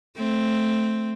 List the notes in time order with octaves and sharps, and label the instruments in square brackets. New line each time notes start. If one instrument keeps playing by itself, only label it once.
[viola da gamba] A3 C4